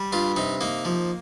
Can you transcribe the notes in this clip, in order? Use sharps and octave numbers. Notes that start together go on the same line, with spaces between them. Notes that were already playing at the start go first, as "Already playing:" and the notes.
Already playing: G3
G2 F4
C3 D#4
A#3 D#4
F3